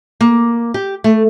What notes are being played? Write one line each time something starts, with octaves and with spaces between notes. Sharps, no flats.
A#3
G4
A3